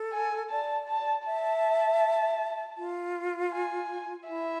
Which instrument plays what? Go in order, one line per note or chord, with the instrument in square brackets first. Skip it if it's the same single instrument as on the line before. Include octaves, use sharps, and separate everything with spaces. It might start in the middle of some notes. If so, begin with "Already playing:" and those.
Already playing: [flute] A4
[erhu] G#5
[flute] D5 [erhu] A5
[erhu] A5
[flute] E5 [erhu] A5
[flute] F4
[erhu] G#5
[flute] E4 [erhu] E5